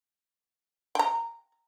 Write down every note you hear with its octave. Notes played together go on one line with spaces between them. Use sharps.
G5 A#5